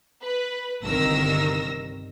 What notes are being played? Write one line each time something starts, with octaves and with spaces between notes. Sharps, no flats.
B4
G1 C2 D#3 A#4 E6 A#6